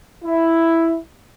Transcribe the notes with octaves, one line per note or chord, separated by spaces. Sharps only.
E4